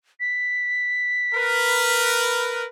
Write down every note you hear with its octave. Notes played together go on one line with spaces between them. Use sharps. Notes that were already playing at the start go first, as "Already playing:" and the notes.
B6
A#4 B4